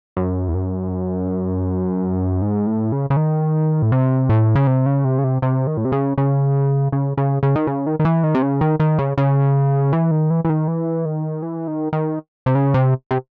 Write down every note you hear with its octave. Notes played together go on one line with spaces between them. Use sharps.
F#2
E2
F#2
G#2
A2
C#3
C#3
D#3
A2
C3
A2
C#3
C3
C#3
C3
C#3
C3
C3
D#3
A2
C3
C#3
C#3
C#3
C#3
C#3
D#3
C#3
D#3
D#3
E3
D#3
C3
C#3
D#3
D#3
C#3
C#3
E3
D#3
E3
E3
D#3
E3
D#3
E3
D#3
D#3
C3
C#3
C3
C3